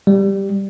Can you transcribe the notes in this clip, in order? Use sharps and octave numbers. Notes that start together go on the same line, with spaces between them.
G3